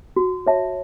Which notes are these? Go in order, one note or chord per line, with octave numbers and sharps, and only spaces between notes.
F#4
C#5 E5 A5